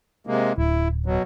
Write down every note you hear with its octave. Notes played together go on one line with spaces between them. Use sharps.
C3 G#3 A#3
D1 E4
B2 F#3